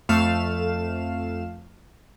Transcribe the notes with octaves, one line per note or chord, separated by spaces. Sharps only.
F2 A3 F5 E7